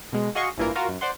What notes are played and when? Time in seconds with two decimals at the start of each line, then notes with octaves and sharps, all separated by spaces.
0.13 B2 G#3
0.35 F#4 G#4 D#5 F5 C6 C#6
0.58 A1 G2 E3 A#3 F4 A#4
0.75 F4 F#4 A#4 F5
0.89 F#2
1.01 C5 D5 F#5 C6